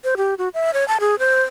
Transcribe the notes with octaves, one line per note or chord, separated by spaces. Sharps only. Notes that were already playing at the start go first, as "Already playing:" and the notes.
C5
G4
F#4
E5
C#5
A5
G#4
C5